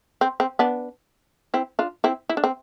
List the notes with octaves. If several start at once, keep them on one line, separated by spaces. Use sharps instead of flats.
C4
C4
B3 D4
C4 E4
D4 F4
C4 E4
E4
D4
C4